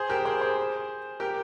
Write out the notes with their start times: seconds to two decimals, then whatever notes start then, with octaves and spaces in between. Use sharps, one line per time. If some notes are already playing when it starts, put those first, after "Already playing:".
Already playing: G#4 C5
0.10 G4 A#4
0.25 G#4 C5
0.41 G#4 C5
1.20 G4 A#4